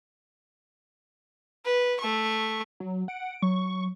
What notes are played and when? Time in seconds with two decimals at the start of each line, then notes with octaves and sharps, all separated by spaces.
1.65 B4
2.00 A3 C#6
2.80 F#3
3.08 F#5 D7
3.42 F#3 C#6